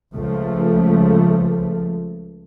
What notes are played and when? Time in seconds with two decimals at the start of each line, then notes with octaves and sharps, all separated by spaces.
0.14 C#2 F3 A3